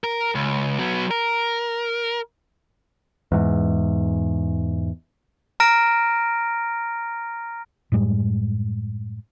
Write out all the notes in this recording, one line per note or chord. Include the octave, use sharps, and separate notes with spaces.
A#4
C#2
F#3 B3
A#4
E2 G#2
A#5 F6 A#6 D7
F#2 A2 G3 G#3